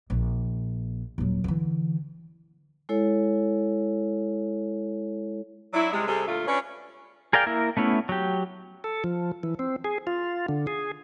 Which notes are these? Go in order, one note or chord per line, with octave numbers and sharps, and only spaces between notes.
A#1
D#1 F#3
D3 E3
G#3 E4 A4 C#5
F#3 D4 E4
C3 G3 G#3
C3 G3 C4 G#4 A4
A#2 D3 A3 F4
C#4 D4 B4 C#5
G#4 A#4 D5 F5 G5
A#3 E4 A#4
A3 B3 C#4 E4
F#3 G4
A4
F3
E3
C4
G#4
F4
D3
G#4